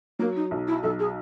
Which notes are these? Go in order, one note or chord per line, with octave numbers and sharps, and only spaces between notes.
F#3 A#3
D#4
B1
E4
B1 A4
G#4